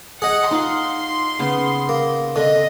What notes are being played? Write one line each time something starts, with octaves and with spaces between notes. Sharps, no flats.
G#4 D#5 F#5
D#4 F4 F#5 C6
C#3 B3
A#3
D3 C4 D#5